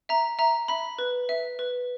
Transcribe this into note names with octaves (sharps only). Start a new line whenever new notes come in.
E5 A#5
E5 A#5
E5 B5
B4
E5
B4